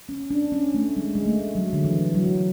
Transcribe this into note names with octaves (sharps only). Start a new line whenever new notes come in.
C#4
D4
C#4
A3
G#3
G#3
A3
F#3
D3
E3
F#3